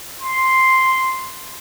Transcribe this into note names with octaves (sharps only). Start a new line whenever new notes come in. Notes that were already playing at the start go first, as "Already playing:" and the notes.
C6